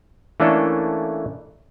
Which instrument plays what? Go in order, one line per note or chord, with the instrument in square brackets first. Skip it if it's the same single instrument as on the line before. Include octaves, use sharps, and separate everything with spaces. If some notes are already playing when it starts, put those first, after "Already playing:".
[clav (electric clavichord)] E3 A3 A#3 C#4 D4 A4